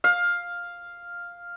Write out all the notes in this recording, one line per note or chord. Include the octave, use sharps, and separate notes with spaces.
F5